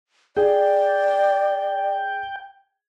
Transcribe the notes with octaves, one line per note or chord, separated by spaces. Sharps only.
G#4 D5 G5